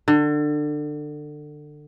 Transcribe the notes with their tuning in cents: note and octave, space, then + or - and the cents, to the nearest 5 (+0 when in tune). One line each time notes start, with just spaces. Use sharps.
D3 +25